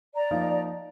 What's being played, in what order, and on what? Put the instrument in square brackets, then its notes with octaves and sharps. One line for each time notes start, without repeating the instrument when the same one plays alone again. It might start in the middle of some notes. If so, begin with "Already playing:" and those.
[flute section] D5 A#5
[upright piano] F3 A#3 D#4